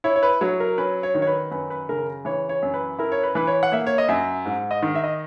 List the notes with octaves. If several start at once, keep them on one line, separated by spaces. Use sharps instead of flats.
E4 C#5
C#5
B4
F#3 C#5
A#4
C#4 B4
C#5
D#3
C#5
B4
F#2 B4
B4
C#3 A#4
E3 C#5
C#5
F#2
B4
E4 A#4
C#5
B4
E3 B4
C#5
F#5
A#3 E5
C#5
D#5
F#2 E5
G#2
D#5
D#3
E5
D#5